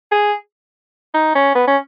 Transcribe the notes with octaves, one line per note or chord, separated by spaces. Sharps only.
G#4
D#4
C#4
B3
C#4